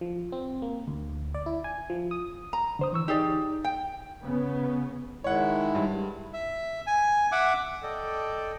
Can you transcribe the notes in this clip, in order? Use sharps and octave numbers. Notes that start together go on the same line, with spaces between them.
F3
C4
A#3
D2
D5
E4
G#5
F3
D#6
A#5
D3 C5 D#6
E3 C#6 E6
D#4 G4 G#4 D5
G5
C#3 B3
D#3 G#3 E4 C#5 F#5
G2
E5
G#5
E5 F#5 D6
A4 D5 D#5 G5